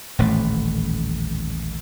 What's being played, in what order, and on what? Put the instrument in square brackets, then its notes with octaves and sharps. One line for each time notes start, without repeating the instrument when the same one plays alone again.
[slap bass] D#1 A1 F2 A3